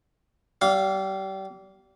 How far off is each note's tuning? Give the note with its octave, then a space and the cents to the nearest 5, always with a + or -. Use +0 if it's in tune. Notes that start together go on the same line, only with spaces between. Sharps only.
G3 -30 F5 +0